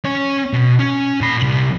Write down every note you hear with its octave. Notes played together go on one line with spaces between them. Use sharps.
C#4 C#5
B2
C#4
A#2 B5
C2